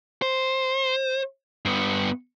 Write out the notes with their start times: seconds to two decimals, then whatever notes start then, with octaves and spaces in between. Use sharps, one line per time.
0.22 C5
1.65 G2 B3